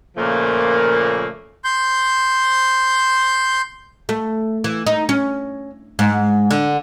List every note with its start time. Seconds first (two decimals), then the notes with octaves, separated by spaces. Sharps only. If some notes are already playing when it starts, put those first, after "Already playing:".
0.17 A#2 C#3 F3 A3 A#3
1.64 C6 G6
4.09 A3
4.64 E3
4.87 D#4
5.09 C#4
5.99 G#2
6.51 D3